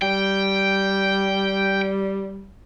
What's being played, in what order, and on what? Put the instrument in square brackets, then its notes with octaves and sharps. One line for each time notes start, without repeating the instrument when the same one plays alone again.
[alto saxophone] G3 [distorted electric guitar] G5